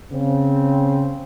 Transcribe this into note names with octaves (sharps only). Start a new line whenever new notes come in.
C#3 C4